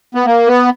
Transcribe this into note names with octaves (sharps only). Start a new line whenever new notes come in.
B3
A#3
B3